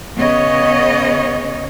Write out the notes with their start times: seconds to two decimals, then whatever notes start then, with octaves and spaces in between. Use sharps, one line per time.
0.17 C#3 B3 C#4 C#5 D#5